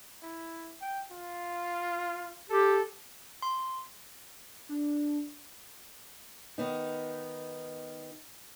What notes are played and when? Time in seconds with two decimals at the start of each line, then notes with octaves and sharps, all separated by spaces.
0.23 E4
0.81 G5
1.11 F4
2.50 G4 A4
3.42 C6
4.69 D4
6.58 D#3 B3 D#4